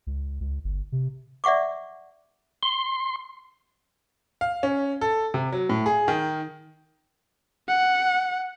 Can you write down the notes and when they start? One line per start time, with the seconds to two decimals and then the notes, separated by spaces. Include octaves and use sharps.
0.07 C#2
0.41 C#2
0.64 G1
0.92 C3
1.44 D5 E5 F#5 C#6 D6
2.63 C6
4.41 F5
4.63 C#4
5.01 A4
5.34 C3
5.53 F#3
5.69 A2
5.86 G#4
6.08 D#3
7.68 F#5